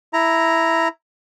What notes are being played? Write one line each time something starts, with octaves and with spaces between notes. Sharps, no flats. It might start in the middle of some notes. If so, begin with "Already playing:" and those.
E4 A#5